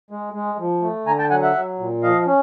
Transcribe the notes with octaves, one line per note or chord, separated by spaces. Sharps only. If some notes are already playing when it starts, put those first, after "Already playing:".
G#3
G#3
F3
A3
D3 G#5 A#5
G5 A5
F#3 F#5 G#5
E5 F#5
F#3
A#2
F3 D#5 F5
C#4